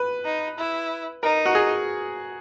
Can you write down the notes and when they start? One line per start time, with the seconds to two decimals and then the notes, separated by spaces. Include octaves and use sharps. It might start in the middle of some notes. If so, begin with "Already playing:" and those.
Already playing: B4
0.25 D#4
0.58 E4
1.23 D#4 A#4
1.46 F#4
1.55 G#4